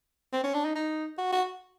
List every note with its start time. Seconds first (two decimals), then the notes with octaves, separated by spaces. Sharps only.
0.33 C4
0.44 C#4
0.54 D4
0.65 D#4
0.75 D#4
1.18 F#4
1.32 F#4